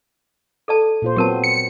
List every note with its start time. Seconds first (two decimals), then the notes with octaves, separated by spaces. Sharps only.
0.68 A4 D5 A5
1.02 A#2 F4 C5
1.16 F#3 B3 C4 G4 A#4 A5
1.44 C#7